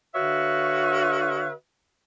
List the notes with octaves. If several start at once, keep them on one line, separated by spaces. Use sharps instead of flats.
D3 F#4 B4 C#5 E5 F5